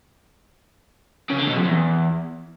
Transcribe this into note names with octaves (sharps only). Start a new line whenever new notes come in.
C#3
D3
B2
F2
E2